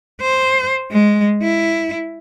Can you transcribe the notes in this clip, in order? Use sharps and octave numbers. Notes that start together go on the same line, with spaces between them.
C5
G#3
E4